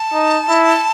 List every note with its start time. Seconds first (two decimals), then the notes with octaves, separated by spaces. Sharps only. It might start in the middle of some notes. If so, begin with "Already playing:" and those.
Already playing: A5
0.13 D#4
0.49 E4